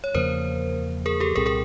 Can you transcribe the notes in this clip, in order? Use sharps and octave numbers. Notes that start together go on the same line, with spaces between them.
C#5
E2 C#3 F3 A#3 A#4 C5
G#4 A#4
G4 A4
C2 A#2 G3 C4 G#4 A#4
G#4 A#4